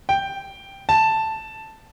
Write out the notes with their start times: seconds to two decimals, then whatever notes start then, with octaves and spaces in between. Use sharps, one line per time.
0.09 G5
0.89 A5